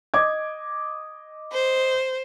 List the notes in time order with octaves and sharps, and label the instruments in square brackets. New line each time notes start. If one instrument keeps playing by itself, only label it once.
[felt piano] D#5 D6 G#6
[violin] C5